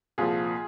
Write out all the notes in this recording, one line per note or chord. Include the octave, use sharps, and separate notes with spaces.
C2 A#2 F3 F4 G#4